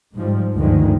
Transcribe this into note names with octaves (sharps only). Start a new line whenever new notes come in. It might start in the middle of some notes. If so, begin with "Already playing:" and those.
G#2 F3 G3
D2 G2 D3 D#3 F3 G#3